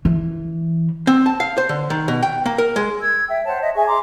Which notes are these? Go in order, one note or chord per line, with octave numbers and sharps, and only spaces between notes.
E3
C4
A5
F5
C5
D3
D#3
B2
G5
A#3
A#4
G#3
E6 G#6
E5 G5
C5 C#5 F#5 A5
D#5 E5 A5
G#4 E5 G#5 C#6
A#5 C6 D6